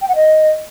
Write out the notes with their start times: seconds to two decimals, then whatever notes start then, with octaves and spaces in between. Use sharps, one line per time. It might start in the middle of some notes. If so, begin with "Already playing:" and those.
0.01 G5
0.08 F#5
0.15 D#5